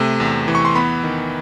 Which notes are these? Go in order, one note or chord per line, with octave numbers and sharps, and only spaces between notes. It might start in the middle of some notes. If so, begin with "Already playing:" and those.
Already playing: C3 A3
E2
E3
C#6
C6
B3 B5
D#3